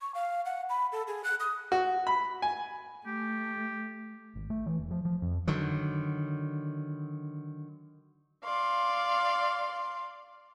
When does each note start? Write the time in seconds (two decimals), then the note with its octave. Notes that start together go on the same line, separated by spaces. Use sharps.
0.01 C#6
0.15 F5
0.45 F#5
0.69 B5
0.92 A4
1.07 G#4
1.24 F#6
1.40 D#6
1.72 F#4
2.07 B5
2.42 G#5
3.06 A3 G4
4.35 G#1
4.50 A3
4.66 E3
4.79 E1
4.91 F3
5.05 F3
5.22 F2
5.48 D3 D#3 F#3
8.43 D5 F5 C6